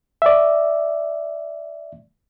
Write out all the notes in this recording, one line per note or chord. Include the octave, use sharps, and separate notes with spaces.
D5 E5